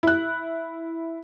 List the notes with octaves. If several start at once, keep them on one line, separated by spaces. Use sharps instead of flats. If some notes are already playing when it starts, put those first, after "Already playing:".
E4 F#6